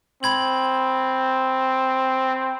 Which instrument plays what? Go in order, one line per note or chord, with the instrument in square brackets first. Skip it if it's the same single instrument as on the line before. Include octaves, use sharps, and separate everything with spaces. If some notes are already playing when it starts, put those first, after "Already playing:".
[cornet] C4 [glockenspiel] B5 G#6 F#7